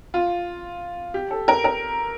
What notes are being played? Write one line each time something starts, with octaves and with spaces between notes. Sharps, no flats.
F4
G4
A4
A#4
A#4